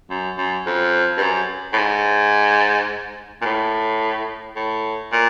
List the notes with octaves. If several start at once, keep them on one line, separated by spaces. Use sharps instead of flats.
F#2
F#2
F2
G2
F#2
A2
G#2
A#2
A2
A2
A#2